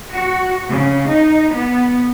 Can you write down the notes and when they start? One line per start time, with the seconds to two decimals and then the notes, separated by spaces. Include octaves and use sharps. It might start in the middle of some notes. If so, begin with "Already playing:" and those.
0.13 F#4
0.70 C#3
1.10 D#4
1.54 B3